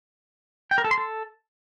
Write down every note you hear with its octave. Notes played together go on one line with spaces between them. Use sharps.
G5
A#4
A4
C6
A4